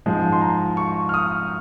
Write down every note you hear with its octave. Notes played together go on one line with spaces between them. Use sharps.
G#2 F3 G#3
C6
A#5
C#6
F6
D#6